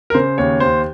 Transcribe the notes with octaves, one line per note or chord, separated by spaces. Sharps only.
A#4
C#3 C5
D#2 C#5
D#2 C5